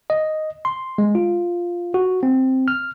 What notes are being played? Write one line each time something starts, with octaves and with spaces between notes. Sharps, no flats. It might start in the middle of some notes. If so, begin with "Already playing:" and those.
D#5
C6
G#3
F4
F#4
C4
F6